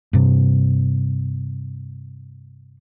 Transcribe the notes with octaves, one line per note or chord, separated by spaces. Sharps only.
G2 C3